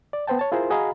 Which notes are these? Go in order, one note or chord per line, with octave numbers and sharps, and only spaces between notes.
D5
B3 B4 C5 G5 A5
C#5 A5
E4 F4 G#4 A#4 C5
F#4 G#4 D#5 F5 A#5 B5